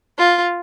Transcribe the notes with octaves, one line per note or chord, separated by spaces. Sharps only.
F4